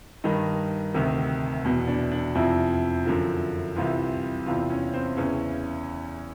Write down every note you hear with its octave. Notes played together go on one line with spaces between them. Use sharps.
G2 D#3 D#4
D2 C3 D#3
E2 B2
D4
D4
F2 C3 F3 E4
F#2 D3 F3
C2 C3 E3 F4
E2 C3 E3 F4
C#4
C4
E2 C#3 E3 C#4